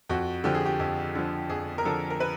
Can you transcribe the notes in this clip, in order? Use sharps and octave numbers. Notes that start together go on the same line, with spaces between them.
F2 F#4
D3 F3 G4
G#4
G4
F2
D3 F3
F2 G#4
A#4
D3 F3 A4
A#4
B4